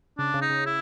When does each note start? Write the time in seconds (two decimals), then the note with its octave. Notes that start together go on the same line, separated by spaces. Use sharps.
0.18 C#3 D4
0.34 C#3
0.42 D#4
0.50 C#3
0.66 E4